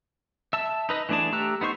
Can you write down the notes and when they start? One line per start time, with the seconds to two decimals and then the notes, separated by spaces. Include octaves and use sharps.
0.53 E5 A5 E6
0.89 D#4 B4 D#5
1.09 E3 A3 D4 G#4 A5
1.32 A3 G4 A#5 E6 F#6
1.61 B3 D#4 C5 C#6 G6